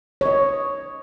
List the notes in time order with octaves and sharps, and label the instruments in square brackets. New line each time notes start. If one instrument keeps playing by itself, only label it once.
[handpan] C#5 D#5